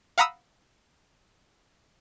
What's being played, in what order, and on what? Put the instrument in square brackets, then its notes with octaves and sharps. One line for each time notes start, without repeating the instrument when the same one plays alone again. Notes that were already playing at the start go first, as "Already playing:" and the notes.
[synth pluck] F5 F#5 A#5 B5 D#6 E6